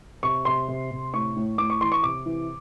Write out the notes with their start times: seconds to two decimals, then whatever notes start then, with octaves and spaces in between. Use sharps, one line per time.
0.23 C3 C#6
0.45 C3 C6
0.68 C3
0.91 C3
1.13 A2 C#6
1.36 A2
1.58 A2 D6
1.70 C#6
1.81 E3 C6
1.92 C#6
2.03 C3 D6
2.26 E3